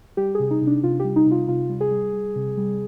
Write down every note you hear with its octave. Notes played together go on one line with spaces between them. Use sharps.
G3 G4
C3 G#4
D#4
C3
D4
C3 F4
G3 G4
D#4
C3
F4
C3 F4
G3
G#4
G3
G3
C3
G3